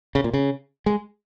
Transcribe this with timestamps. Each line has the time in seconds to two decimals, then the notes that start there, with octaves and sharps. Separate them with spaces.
0.15 C#3
0.24 A#2
0.33 C#3
0.86 G#3